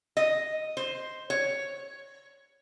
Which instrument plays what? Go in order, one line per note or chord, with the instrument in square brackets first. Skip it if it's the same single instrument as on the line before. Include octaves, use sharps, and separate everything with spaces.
[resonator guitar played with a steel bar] D#5
C5
C#5